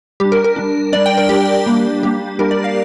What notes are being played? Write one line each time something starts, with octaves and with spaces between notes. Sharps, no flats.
G3 D4 G4
A#4
A#4
G3 D4
G3 D4 D5
G5
A#4
G3 D4 G4
G3 A#3 D4
G3 A#3 D4 G4
G3 A#3 D4 A#4
D5
F5